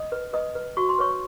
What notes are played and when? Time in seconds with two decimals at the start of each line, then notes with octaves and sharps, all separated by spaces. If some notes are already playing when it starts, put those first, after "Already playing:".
Already playing: D#5 D#6
0.12 B4
0.33 B4 D#5 D#6
0.55 B4
0.77 F#4 C#6
0.89 C6
0.98 B4 C#5 C#6